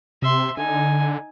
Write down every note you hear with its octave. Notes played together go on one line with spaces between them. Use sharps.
C3 E5 C6
D3 D#4 G#5